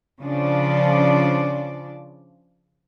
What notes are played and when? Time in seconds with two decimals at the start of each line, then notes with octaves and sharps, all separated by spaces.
0.21 C#3 F3 D4 D5